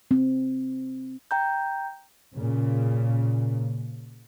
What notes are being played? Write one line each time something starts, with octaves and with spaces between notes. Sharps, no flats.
C4
G5 A#5 G6
A#2 C#3